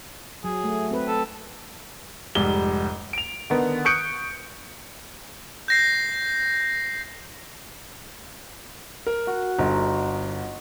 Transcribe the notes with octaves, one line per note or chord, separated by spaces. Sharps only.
F#3 G#4
A3
C4 B4
A4
F1 G#2 G3 G7
D7 F7
D3 D#3 B3
C#6 D#6 F#6 G6 C#7 D7
G6 A#6 C7
A#4
F#4
G1 D#4